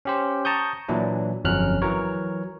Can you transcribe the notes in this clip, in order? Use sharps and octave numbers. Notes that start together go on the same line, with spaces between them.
C#4 G4 C5
A5 A#5 C#6 D#6 G6
A#2 E3 F#3 D4 E4
G1 F2 F#3 C#4 F6 F#6
E3 F#3 A#4 C#5